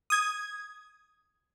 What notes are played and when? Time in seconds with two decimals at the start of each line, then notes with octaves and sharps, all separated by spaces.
0.10 D#6 G#6